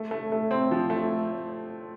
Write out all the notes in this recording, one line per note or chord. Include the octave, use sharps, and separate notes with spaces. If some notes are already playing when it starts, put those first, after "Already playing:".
Already playing: A3
A3
A3
C4
F3
A3